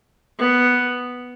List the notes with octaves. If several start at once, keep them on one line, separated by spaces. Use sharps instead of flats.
B3